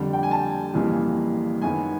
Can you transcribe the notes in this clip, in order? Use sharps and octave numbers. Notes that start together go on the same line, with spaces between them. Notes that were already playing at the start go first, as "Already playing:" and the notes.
Already playing: F2 D3 G3
G5
G#5
A5
F2 C#3 E3 G3 A#3
F#2 D#3 G#3 B3 G#5